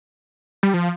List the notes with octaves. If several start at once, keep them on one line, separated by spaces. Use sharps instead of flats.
G3
F3